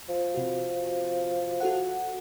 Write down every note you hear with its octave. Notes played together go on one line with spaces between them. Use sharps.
F3
C3 F#4
F#4 A4 F#5